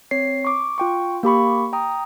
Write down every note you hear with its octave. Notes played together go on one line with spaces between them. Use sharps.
C4 C#5 C7
C#6 D6
F4 G5 C#6
A#3 G4 B5 C#6
G5 A#5 D#6